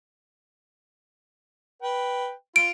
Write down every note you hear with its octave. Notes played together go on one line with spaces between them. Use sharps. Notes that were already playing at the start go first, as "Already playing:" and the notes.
B4 G5
F4 D7